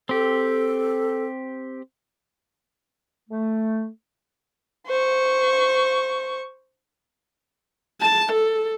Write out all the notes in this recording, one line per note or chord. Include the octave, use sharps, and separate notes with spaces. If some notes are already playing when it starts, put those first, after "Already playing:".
C4 G4 A4
A3
C5 C#6
A5
A4